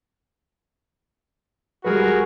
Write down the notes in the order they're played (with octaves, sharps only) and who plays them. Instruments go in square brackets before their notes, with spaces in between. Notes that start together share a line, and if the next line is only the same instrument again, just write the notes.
[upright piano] G3 G#3 B4 [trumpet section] F#4 G#4 A#4